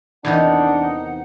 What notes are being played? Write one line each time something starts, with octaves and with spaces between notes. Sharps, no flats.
E2 C3 D#3 D4 D#4 F#5